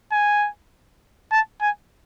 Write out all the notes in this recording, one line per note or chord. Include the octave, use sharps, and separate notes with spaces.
G#5
A5
G#5